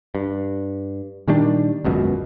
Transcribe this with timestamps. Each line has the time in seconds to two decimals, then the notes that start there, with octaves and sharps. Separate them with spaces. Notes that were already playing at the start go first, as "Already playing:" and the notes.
0.15 G2
1.28 A#2 D#3 G3 D4
1.84 G#1 C#2 F#2 B2